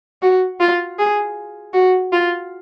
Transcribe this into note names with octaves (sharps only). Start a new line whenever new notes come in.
F#4
F4
G#4
F#4
F4